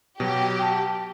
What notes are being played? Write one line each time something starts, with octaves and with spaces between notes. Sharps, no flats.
B2 F#3 G4
G5 A5